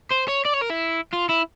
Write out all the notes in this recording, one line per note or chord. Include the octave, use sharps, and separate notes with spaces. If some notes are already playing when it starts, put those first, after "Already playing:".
C5
C#5
D5
C#5
A#4
E4
F4
E4